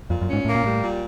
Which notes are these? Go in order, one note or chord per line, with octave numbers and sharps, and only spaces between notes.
F2 A#2
F#2
C#4
G#2
A2 A#3
A#2
A2 G3
A#2